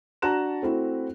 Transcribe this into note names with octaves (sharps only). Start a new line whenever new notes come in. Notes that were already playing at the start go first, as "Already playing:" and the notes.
D4 F#4 A5 A#5 F#6 E7
A3 C4 E4 F#4